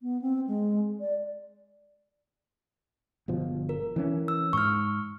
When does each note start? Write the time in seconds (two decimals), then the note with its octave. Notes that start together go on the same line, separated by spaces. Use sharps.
0.02 B3
0.21 C4
0.47 G#3
1.00 D5
3.28 G1 B2 F3
3.69 A#4
3.96 E3 C4 C#4
4.28 E6
4.53 G#2 C#6 F6